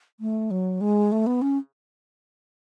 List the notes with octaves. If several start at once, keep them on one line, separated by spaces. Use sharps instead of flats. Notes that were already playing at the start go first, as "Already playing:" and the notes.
A3
F#3
G#3
A3
B3
C#4